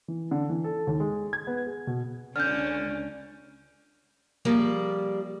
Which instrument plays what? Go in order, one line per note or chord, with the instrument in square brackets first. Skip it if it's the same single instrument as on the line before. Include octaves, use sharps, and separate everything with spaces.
[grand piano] E3
D3
E3
A4
D#2
G#3
G#6
B3
G#4
B2
[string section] C#2 C#4 [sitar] D3 [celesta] F6 G6
[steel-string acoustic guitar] F3 G3 A#3 G#4